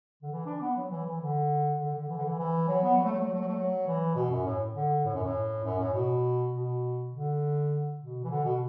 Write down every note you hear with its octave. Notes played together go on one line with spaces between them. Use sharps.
D3
E3
D4
B3
F#3
E3
E3
D3
D3
D3
E3
D3
E3
E3
F#3
B3
F#3
A3
F#3
A3
F#3
A3
F#3
A3
F#3
E3
B2
F#2
A2
D3
A2
F#2
A2
F#2
A2
B2
B2
D3
B2
E3
D3
B2